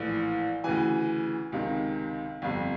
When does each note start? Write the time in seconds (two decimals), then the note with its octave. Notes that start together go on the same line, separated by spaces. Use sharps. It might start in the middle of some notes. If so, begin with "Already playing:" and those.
Already playing: A#1 A2 E3
0.64 D2 C#3 E3 G#5
1.52 C#2 C3 D#3
2.42 G1 F2 C3